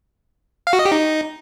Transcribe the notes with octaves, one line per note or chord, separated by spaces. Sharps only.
F5
F#4
D#5
G4
D#4